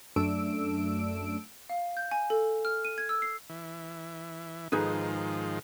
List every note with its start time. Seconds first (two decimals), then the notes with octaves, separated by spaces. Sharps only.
0.16 F#2 A3 D4 E6 D7
1.70 F5
1.97 G6
2.11 G#5
2.30 A4
2.65 F6
2.85 D#7
2.98 G#6
3.09 E6
3.22 C7
3.49 E3
4.72 G#2 D#3 F3 D#4 G#4 B4